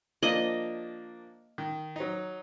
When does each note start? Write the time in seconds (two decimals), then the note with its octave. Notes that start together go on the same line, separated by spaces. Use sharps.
0.23 F3 A#3 D4 D#5
1.58 D#3
1.96 F#3 D#4